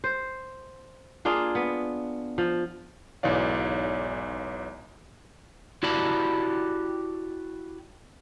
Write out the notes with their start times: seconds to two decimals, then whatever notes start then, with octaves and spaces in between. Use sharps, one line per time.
0.04 C5
1.25 A#3 D4 F4 G#4
1.55 B3
2.38 F3
3.23 B1 G#2 E3 C#5 D5 F5
5.83 E4 F#4 G4 D5 A5 B5